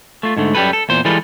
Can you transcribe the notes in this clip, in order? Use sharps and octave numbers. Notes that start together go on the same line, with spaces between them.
A3 F4
G#2 D3 A3
F#2 G3 G4 A4 B4
A4
E2 A#2 C5
E3 G3 G#3 F4 A4 B4